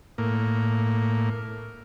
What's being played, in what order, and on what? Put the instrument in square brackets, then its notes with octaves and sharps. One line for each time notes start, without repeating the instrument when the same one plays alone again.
[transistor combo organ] A2 A#3